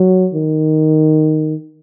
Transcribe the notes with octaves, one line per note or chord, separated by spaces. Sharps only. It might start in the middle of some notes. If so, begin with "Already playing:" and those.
Already playing: F#3
D#3